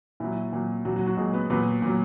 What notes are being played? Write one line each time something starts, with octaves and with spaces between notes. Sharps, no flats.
A#2 F#3 E4
A#2 F#3
A#2 F#3 F#4
F#3 F#4
F#3 F#4
A#2 F#3 G#3 G#4
B3 B4
A#2 F#3 B3 B4
A#2 F#3